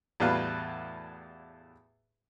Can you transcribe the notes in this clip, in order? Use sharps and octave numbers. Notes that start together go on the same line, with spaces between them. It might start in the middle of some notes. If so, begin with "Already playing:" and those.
E2 A2 G3 F#4 B4 F5